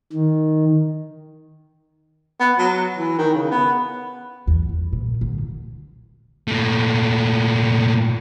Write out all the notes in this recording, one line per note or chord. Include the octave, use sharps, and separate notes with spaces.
D#3
B3
F#3
E3
D#3
C#3
B3
E2
E3
A#2
D3 D#3
A#2 A3